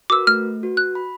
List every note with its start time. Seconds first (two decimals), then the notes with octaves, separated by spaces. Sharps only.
0.10 F#4 A#4 B4 D6 E6
0.27 A3 F6
0.63 F#4 B4
0.77 F#6
0.95 B5